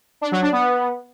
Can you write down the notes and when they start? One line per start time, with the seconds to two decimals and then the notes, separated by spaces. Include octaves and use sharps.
0.21 D4
0.32 F#3
0.42 D4
0.52 B3